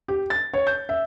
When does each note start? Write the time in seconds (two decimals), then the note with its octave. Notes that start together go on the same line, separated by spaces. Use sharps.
0.08 G4
0.30 A6
0.53 C#5
0.67 G6
0.89 E5